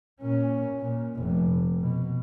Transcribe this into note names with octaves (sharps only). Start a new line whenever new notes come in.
A#2 C#4
A#2
F1
B2